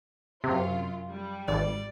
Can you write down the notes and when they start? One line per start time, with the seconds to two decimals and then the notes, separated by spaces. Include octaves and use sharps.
0.44 F#2 C3 F4
1.09 G3
1.48 G#1 D5